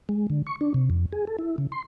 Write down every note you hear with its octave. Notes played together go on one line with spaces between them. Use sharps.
G#3
D3
C#6
D4
C3
F2
G#4
A4
E4
C#3
C6